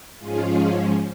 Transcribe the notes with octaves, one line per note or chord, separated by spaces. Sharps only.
G#2 F3 G#3 C#4 F4 G#4